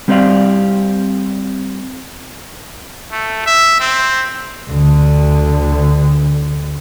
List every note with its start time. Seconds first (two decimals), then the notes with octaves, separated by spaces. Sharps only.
0.08 G3 C4 G4 C#5 D5 F5
3.12 A3
3.46 E5
3.80 C4
4.70 D2 D3